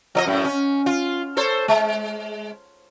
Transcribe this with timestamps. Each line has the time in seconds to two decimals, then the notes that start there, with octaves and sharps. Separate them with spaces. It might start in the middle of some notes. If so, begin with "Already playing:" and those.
0.15 F3 D5 D#5
0.26 F#2 A2
0.44 C#4
0.86 F4
1.37 A4 C5 C#5
1.68 G#3